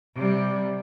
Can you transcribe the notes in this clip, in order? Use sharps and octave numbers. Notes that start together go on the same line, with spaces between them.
C3 G3